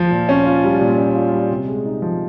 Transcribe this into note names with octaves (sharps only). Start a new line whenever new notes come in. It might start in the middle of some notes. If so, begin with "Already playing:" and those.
Already playing: F3
A#2
C#4
F4
G3
A#2
C#4
F4
G3
C3
G#3
D#4
F3